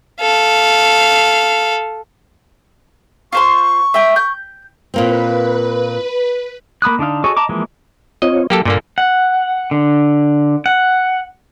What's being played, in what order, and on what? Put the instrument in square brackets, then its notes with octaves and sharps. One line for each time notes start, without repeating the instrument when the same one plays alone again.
[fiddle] A4 F5
[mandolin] F4 C5 C6 [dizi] C#6
[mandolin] E5 G5
G6
[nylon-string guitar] A#2 A#3 C4 [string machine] B4
[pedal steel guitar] A#3 B5 D#6 F#6
D3 D4 D#4 F5
F#4 G#4 A4 C#5 D#5
D#5 A5 A#5 D6
E3 F3 G#3 A#3
[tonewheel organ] C4 F4 C#5 [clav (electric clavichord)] D#5
[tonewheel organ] F#3 G5 [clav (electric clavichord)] A#3 G4 A4
[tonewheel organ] G2 [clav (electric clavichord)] A#2 D3 A#3
[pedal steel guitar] F#5
D3
F#5